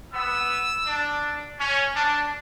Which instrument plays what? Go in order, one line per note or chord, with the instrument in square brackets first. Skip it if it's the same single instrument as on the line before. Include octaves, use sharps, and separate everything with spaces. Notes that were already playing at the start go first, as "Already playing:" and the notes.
[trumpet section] B3 [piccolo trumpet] E6
[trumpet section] D4
C#4
D4